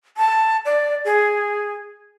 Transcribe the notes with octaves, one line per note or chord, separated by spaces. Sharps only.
A5
D5
G#4